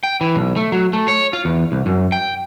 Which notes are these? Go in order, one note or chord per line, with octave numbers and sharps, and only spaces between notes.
G5
E3
B1
A3
F#3
A3
C#5
F4
E2
C2
F#2
G5